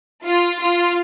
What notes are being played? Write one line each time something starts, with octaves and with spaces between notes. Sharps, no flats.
F4
F4